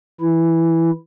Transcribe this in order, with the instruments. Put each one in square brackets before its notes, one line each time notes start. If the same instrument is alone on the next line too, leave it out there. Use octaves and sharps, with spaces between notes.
[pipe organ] E3 E4